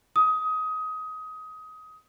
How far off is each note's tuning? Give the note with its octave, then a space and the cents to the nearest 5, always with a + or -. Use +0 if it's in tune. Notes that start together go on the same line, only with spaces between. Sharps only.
D#6 +20